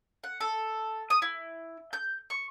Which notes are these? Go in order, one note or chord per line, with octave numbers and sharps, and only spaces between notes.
F#5
A4
D#6
E4
G6
C#6